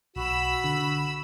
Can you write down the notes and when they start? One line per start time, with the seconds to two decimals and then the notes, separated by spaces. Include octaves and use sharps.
0.16 B1 F#4 B5 E6
0.64 D3